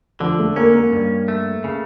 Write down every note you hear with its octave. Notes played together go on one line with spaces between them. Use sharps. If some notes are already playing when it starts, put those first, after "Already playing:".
D3 F3
A3
A#3 C#4
A#3
G2
A3
C#3